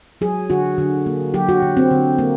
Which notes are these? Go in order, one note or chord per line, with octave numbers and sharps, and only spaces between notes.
F#3 G#4
D3 F#4
D3
A#3
F#3 G4
F#4
D3
C4
D3
A#3